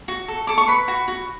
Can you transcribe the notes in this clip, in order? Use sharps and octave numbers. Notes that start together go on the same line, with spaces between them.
F#4
A4
A4 D6
C#6
B4 B5
F#4
F#4